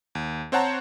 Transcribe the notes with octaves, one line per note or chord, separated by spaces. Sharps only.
D#2
C4 C5 C#5 F#5 A5 A#5